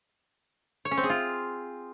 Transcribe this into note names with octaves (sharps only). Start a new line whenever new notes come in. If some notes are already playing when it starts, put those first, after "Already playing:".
C#5
C#4
C4
G#4
F4